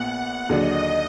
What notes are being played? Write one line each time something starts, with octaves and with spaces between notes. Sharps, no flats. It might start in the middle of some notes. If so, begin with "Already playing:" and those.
Already playing: A#1 A#2 B3 F#5
D#2 D3 F#3 D4 G#4 D#5